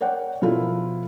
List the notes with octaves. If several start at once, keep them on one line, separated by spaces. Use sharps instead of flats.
A#4 C#5 D5 F#5 G5
B2 F3 E4 F4 A4 A#4